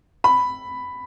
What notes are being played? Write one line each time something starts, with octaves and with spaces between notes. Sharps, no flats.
B5